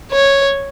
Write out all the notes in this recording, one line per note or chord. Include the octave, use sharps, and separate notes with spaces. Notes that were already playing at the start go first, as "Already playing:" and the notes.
C#5